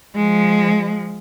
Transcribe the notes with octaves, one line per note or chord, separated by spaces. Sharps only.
F3 G#3